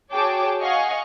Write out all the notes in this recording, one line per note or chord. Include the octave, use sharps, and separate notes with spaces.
F#4 G#4 C#5 G5 A5 D6
D#5 F5 F#5 G#5 C#6